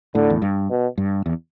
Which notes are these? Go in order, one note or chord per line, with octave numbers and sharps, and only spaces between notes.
A2 D3
E2
G2
B2
G2
E2